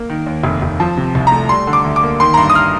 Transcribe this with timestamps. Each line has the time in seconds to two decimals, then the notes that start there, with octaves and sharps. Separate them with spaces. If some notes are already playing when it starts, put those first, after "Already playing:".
Already playing: A#3
0.10 D#3
0.26 D#2
0.44 F1
0.62 F1
0.80 F3 A5
0.97 C3
1.15 C2
1.27 A#5
1.32 A3
1.49 G3 C6
1.67 D3
1.73 D6
1.84 D2
1.96 D6
2.03 A#3
2.20 D#3 C6
2.34 A#5
2.37 G2 C6
2.50 D#6
2.55 F6